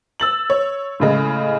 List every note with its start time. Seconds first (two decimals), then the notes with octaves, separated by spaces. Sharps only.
0.20 E6 A6 F#7
0.50 C#5
1.00 A2 C#3 G#3